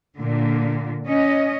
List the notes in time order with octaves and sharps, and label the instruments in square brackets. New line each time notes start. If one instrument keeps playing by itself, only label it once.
[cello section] A#2 D3
C#4 D#5